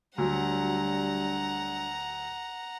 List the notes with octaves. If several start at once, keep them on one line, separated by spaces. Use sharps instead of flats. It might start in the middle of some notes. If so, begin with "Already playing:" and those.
D2 F#3 G3 D4 F#5 A#5